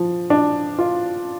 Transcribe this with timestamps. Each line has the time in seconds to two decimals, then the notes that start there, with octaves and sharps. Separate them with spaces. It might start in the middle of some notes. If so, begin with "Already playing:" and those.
Already playing: F3
0.30 D4
0.79 F4